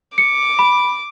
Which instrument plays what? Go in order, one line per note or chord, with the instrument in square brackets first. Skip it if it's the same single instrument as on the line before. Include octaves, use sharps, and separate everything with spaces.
[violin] D6 [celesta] C#7
[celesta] B5